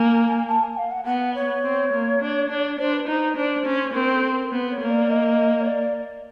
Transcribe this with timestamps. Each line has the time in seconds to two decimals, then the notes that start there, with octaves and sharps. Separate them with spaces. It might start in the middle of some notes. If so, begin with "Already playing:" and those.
Already playing: A#3 G#5
0.48 A5
0.63 G#5
0.78 F5
0.91 F#5
1.05 B3 F#5
1.35 C#5
1.64 C4
1.93 A#3
2.21 D4
2.50 D4
2.78 D4 C5
2.93 B4
3.06 D#4 C5
3.36 D4 C5
3.66 C#4
3.94 C4 A#4
4.13 A4
4.32 A#4
4.52 B3 B4
4.71 C#5
4.80 A#3
4.90 D5
5.10 D#5
5.61 C#5
5.67 D5